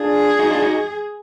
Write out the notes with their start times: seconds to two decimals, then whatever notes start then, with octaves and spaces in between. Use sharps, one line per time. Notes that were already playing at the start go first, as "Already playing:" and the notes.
Already playing: D4 F4 G#4
0.39 D#4 F#4
0.50 D4 F4
0.62 D#4 F#4